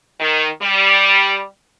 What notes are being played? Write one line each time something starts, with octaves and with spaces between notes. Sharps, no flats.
D#3
G3